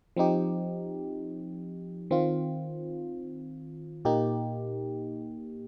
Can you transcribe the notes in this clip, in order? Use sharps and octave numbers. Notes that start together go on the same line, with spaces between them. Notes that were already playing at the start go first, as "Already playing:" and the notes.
F3 C4 D#4 G4
D#3 C4 F4
A#2 A#3 D#4 G4